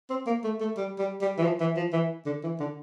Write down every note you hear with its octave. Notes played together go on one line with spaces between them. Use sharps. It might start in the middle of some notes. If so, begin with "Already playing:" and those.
C4
A#3
A3
A3
G3
G3
G3
E3
F3
E3
F3
E3
D3
E3
D3